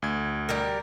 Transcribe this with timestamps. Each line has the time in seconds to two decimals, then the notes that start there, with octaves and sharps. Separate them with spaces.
0.02 D2 G#6
0.49 G3 G4 A#4